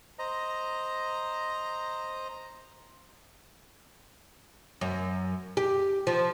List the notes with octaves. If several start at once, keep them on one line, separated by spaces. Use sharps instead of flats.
C5 D#5 A#5
F#2
G4
F3